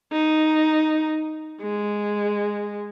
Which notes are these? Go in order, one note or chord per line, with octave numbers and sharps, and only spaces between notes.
D#4
G#3